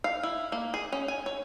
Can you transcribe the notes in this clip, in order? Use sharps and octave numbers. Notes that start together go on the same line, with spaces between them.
F5
E4
A#3
G#4
C#4
G#5
C#5